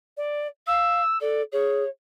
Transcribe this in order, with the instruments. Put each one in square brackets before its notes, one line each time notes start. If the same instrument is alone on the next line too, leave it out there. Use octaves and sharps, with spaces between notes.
[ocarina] D5
[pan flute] F5 [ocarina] E6
[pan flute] A4 [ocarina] D5
[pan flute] G#4 [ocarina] C#5